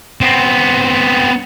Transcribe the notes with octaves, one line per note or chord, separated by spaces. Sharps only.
B3 C4